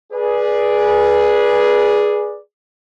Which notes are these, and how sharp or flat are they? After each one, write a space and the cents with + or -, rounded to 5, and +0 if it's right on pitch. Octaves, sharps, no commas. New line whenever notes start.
G#4 +0 B4 -25 D5 +0